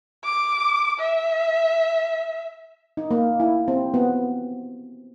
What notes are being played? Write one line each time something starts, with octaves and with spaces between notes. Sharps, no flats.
D6
E5
D#4
A#3
E4
C4
B3